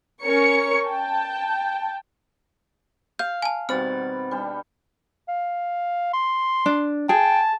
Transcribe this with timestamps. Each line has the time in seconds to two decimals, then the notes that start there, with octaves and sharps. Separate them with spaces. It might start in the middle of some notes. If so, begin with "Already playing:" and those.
0.23 C#4 A#4 C#5 C#6 C#7
0.86 G5 A5
3.19 F5 G6
3.42 G#5 A5
3.69 B2 D#3 G3 C4 C5 F6 A6
4.31 G3 D4 G5
5.28 F5
6.14 C6
6.66 D4
7.09 G#4 G5 A5